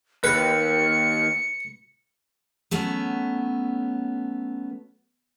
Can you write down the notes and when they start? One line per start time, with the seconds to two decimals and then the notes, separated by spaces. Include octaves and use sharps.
0.24 D#2 B4 C#7
2.71 F#3 A3 B3 C#4